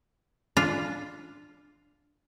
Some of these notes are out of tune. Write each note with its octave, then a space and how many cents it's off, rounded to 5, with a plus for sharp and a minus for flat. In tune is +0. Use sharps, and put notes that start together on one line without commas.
D4 +0 F4 +0